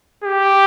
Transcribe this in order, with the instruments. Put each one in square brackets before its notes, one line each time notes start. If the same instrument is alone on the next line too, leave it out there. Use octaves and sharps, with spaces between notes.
[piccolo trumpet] G4